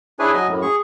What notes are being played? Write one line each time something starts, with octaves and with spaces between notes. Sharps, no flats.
D4 E4 G#4 B4 C#5 G#5
F#3 D#5 G#5
F#2 A2
G#4 C#6